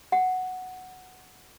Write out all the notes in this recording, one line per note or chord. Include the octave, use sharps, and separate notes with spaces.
F#5